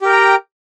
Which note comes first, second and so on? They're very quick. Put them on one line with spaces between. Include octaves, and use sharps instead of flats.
G4 A#4 G5 A#5